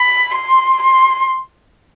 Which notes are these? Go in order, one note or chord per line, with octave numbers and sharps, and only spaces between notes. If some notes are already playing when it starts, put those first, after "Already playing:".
Already playing: B5
C6
C6